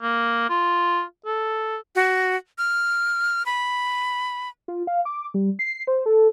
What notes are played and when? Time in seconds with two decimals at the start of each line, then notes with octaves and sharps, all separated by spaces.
0.02 A#3
0.49 F4
1.26 A4
1.95 F#4
2.58 F6
3.46 B5
4.68 F4
4.87 F5
5.05 D6
5.34 G3
5.59 C7
5.87 C5
6.06 A4